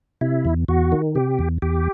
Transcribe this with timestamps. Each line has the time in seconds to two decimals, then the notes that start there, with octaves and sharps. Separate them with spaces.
0.21 C3 E4
0.45 E2
0.68 E2 F#4
0.92 D#3
1.15 C3 G4
1.39 E2
1.62 E2 G4